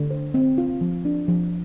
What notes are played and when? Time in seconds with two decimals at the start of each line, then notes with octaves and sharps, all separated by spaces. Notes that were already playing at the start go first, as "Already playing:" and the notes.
Already playing: D3
0.11 C5
0.34 C4
0.58 F4
0.81 F3
1.05 D4
1.28 F3